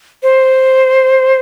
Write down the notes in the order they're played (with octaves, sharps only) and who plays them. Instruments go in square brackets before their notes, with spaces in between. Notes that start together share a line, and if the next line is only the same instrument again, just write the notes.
[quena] C5